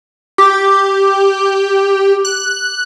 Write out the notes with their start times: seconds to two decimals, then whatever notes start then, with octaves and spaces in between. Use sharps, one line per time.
0.38 G4 D6
2.25 F#6